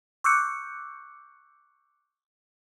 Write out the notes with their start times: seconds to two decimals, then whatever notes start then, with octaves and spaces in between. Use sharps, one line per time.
0.24 C#6 D6 E6 F#6 G6 C#7